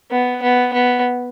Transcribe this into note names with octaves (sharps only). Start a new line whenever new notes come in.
B3
B3
B3